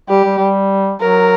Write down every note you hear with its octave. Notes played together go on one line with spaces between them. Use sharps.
G3 G4
G3
G3
F#3 A#4